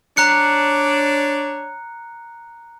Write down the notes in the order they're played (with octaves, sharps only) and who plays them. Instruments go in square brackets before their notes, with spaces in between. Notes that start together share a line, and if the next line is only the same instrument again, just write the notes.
[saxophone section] D4 C#5 [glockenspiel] A#5 F#6 C#7